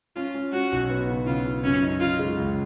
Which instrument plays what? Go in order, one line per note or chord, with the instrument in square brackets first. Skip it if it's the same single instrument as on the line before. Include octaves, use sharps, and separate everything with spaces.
[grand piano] C#4 [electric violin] F4
[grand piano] C#4
[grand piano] C#4 [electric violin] F#4
[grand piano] B1
B3
C#3
[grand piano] C#3 [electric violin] F4
[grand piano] C#3
[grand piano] F#2 [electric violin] C#4
[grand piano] D#4
[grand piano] C#3 [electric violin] F4
[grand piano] G#3
C#2